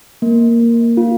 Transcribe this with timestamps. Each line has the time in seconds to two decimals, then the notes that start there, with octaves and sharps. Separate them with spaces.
0.22 A#3
0.60 A#3
0.97 F4